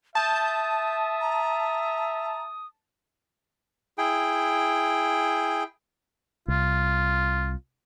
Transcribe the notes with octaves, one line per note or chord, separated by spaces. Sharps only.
E5 A5 D#6 G6
A#5
E4 G#4 G5
C2 F4